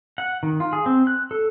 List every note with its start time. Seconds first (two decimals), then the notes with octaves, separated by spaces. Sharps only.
0.18 F#5
0.43 D#3
0.60 F4
0.73 G#4
0.86 C4
1.07 F#6
1.31 A4